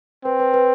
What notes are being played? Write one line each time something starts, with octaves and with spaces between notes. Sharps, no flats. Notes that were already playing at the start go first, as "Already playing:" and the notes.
C4 B4
B4
B4